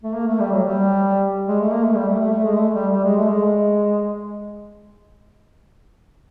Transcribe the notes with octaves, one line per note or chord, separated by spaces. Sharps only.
A3
A#3
A3
G3
F#3
G3
G#3
A3
A#3
A3
G3
A3
A3
A3
G#3
A3
G3
G3
G#3
A3
G#3